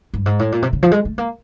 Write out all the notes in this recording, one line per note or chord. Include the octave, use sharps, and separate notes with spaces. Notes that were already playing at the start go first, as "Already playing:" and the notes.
G2
G#2
A2
A#2
C3
C#3
F3
G#3
A3
A#3